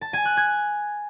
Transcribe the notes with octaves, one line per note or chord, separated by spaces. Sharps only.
A5
G#5
F#6
G#6